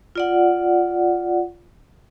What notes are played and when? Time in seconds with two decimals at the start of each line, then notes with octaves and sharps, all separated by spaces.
0.15 F4 D5 F#5